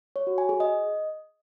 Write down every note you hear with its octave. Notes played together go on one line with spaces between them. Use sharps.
C#5
F#4
G#5
G#4
D#5